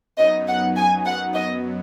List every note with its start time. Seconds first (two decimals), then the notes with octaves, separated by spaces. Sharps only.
0.18 F#2 F#3 B3 D#4 D#5
0.47 F#5
0.75 G#5
1.04 F#5
1.33 F#2 F#3 B3 D#5